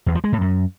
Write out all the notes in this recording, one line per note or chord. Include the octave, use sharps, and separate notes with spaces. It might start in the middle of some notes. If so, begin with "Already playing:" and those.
E2
F3
G#3
A2
F#2